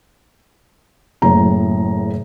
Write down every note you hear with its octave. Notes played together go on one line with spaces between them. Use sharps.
F#1 A2 A#5